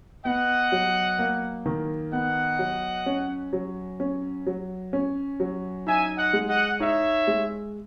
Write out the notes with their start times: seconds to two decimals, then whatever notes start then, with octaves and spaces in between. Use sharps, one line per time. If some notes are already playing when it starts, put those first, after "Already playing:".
0.25 B3 D#5 F#5
0.72 F#3
1.19 A#3
1.66 D#3
2.12 B3 D#5 F#5
2.59 F#3
3.06 C#4
3.53 F#3
4.00 C#4
4.47 F#3
4.93 C#4
5.40 F#3
5.87 D#4 E5 G#5
6.17 D#5 F#5
6.33 G#3
6.49 D#5 F#5
6.80 D#4 C#5 E5
7.27 G#3